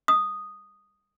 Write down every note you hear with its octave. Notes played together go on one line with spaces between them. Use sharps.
D#6